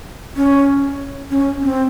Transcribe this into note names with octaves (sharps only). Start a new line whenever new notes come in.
C#4
C#4
C4